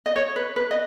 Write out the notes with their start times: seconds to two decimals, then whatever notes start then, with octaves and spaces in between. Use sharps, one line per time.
0.06 D#5
0.16 C#5
0.36 B4
0.56 B4
0.71 D#5